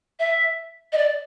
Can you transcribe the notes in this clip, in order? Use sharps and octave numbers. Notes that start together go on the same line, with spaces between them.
E5
D#5
D5